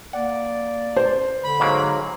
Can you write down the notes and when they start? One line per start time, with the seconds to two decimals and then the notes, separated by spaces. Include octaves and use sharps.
0.13 A#3 D5 F#5
0.96 C5
1.43 D3 B5
1.60 G#2 F#3 A#3